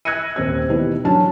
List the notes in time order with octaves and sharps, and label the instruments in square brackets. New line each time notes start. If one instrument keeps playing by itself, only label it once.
[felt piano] E6 F#6 G#6 A#6 C#7 D#7
D#1 C4 G#6
B2 D#3 G3 E4
D3 F#3 C#4 A5